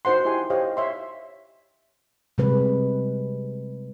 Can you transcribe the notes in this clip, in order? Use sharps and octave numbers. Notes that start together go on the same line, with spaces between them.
D#4 F#4 C5 F#5 C6
E4 G4 G#5 C6
G4 C5 C#5 D#5 F5
C#5 E5 C6
C3 G3 G#3 B4